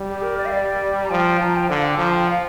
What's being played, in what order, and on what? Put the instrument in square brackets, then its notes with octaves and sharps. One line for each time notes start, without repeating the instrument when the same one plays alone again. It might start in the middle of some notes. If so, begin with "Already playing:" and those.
Already playing: [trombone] G3
[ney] G4
A#4
D5
F5
D5
A#5
[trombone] F3 [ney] G5
[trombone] F3 [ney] A#5
[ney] G5
[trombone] D3 [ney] F5
[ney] G5
[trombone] F3 [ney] A#5
[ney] G5
F5